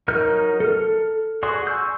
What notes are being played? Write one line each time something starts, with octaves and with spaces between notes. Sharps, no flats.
F#3 D#4 A#4 F6 G6
A4 F6
F#4 G#4 D5 C6
G#5 C#6 E6 G6